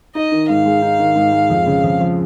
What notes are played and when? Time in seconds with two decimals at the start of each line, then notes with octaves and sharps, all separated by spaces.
0.15 D#4 D#5
0.32 D#3
0.49 G#2 F5
0.65 G#3
0.82 D#4
0.99 D#3
1.16 G#2
1.32 G#3
1.50 F2
1.66 C#3
1.84 F2
2.00 F3